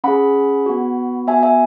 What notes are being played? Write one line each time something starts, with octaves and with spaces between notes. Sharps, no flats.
C#4 G#4 F#5 B5
B3 F#4
B3 F#4 E5 G#5
E5 G#5